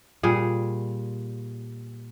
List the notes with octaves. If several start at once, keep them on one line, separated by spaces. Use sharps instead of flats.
A#2 G3 G#4